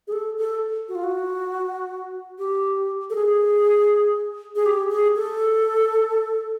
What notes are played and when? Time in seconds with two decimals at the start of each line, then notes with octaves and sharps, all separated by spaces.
0.07 G#4
0.12 A4
0.38 A4
0.88 F#4
0.95 F4
1.03 F#4
2.38 G4
3.10 A4
3.15 G#4
4.56 G#4
4.66 G4
4.90 G#4
5.16 A4